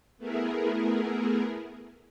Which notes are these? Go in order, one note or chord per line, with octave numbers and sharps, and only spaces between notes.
A3 B3 E4 G#4 A#4